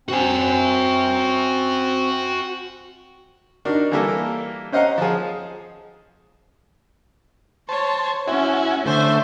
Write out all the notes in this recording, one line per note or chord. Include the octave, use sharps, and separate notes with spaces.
C4 F#4 G#5
D4 D#4 F#4 A#4
E3 G3 A#3 G4 A4 A#4
C#4 C5 D#5 F5 F#5 A#5
F3 G#4
C5 C#5 A5
C#4 E4 F#4 G#5
D3 A3 C5 E5